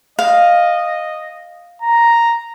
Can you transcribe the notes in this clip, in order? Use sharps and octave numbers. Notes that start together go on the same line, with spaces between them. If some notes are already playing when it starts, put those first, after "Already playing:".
D#5 F5
A#5